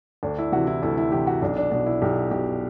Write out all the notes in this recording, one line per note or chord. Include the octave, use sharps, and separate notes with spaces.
D2 D4
E4
C3 E3 F#4
E4
D2 E4
E4
C3 E3 G4
F#4
B1 D4
D4
B2 D4
E4
B1 G4
B2 G4